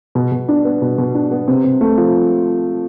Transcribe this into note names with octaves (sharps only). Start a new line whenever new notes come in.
B2
B2
D4
B3
B2
B2
D4
B3
C3
C3
A3
F3